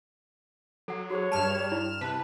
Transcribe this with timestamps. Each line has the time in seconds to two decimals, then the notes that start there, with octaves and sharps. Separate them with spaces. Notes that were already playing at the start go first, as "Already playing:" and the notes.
0.88 F#3 A4 F#5
1.10 F#4 G#4 C5 C#5
1.32 G2 G3 A5 F6 E7
1.72 E4
2.01 C3 B4 A5